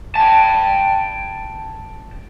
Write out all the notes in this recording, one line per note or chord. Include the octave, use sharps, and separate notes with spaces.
G5 A5